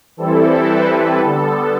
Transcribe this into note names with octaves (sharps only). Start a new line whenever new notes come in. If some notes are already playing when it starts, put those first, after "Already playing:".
E3 G3 C4 E4 A4
B4
D3 G3 B3 A4